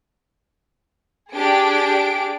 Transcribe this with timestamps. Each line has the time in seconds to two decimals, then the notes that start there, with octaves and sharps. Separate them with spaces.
1.34 D4 G4 G#4 D7